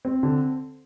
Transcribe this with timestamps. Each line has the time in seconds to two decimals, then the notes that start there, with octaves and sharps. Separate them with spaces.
0.05 C4
0.23 D3